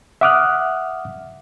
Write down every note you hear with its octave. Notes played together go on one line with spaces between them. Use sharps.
E5 F#5 D6 D#6 F6 F#6